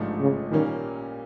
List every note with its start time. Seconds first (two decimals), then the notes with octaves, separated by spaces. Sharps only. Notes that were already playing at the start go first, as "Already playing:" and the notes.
Already playing: A1 G#2 F3 A3 D4
0.20 C#3
0.51 A#2 D#3 G3 A#3 C#4